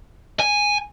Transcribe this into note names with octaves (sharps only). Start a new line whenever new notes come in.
G#5